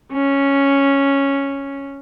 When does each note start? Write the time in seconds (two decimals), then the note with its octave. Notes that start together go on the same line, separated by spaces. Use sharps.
0.13 C#4